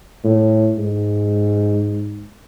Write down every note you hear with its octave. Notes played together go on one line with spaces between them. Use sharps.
A2
G#2